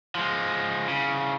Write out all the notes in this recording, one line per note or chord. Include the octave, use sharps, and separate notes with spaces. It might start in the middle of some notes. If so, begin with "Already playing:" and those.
F3 G#3
C2 C#3